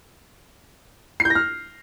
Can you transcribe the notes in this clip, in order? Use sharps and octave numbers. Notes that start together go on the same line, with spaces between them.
C7
G6
A#6
F6